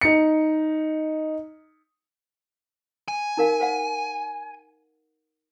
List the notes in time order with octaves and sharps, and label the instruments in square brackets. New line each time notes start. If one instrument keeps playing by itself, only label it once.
[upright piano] D#4 C#7
[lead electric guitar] G#5
[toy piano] D#4 A#4 F5
C5 F5 F#5